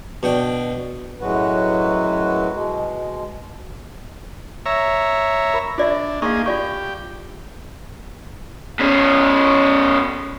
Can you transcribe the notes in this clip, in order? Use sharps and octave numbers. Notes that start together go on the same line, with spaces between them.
B2 D4 G5
F#2 A2 F#3 G#3 F#4 B4
B2 G#3
C#5 E5 A#5
A#4 B5
D4 F4 D5 E5
A#3 D#4 G#4 F5 C6 C#6
F4 G4 D5 C#6
B2 C#4